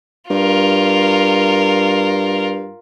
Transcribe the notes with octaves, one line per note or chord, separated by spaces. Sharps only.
G2 F4 A#4